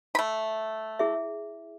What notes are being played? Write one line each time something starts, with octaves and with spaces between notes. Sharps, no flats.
A3 B5
E4 G#4 E5